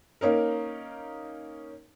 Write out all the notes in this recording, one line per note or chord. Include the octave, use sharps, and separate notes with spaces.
A#3 C#4 D#4 A#4